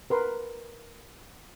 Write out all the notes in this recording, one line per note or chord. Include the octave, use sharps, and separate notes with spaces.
A#4 B4 C6